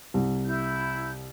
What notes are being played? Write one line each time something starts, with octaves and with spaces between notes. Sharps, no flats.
C2
E4 G6